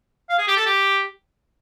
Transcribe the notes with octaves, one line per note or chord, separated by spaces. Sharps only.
F5
G#4
G4
A4
G4